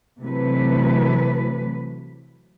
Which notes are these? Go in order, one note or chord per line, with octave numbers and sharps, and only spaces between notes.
C3 E3 F#3 A3 B4